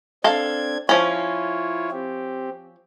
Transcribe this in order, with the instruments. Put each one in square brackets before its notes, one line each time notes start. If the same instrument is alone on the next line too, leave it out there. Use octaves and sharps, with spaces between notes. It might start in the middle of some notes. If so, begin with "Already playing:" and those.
[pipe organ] C4 D4 G#6 [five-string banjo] A4 F5
[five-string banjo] F3 C#4 [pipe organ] E4 F4 C#5
[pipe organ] C4 G4